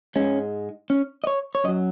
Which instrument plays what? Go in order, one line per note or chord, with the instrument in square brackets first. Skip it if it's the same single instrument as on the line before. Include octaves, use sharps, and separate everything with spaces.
[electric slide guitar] G#2 G#3 C#4
C#4
D#5
C#5
C#5
F#2 D#5
F#3